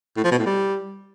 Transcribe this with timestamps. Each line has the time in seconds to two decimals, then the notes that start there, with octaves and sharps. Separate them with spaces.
0.16 A2
0.24 F3
0.31 B2
0.39 A2
0.46 G3